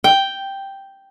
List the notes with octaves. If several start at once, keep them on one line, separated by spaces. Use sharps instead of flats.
G5